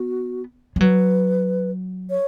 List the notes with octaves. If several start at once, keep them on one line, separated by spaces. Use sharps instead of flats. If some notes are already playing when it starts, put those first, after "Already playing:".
Already playing: B3 F#4
G#3
F#3 B4
C#5